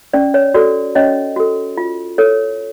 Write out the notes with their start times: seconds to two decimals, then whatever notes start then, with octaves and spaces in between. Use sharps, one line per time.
0.14 C#4 D5
0.34 C#5
0.54 F#4 A4 D5
0.95 C#4 C#5 D#5
1.36 F#4 A4
1.77 F4
2.18 A4 C#5